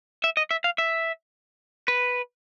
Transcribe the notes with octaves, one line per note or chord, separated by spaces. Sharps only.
E5
D#5
E5
F5
E5
B4